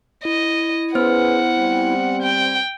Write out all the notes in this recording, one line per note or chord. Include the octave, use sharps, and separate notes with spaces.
E4 D#5
B3 C#4 G#4 B4 C5 F#5 F6
G3 C4
G5